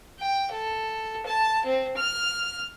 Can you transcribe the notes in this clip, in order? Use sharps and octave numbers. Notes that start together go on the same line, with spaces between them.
G5
A4
A5
C4
F6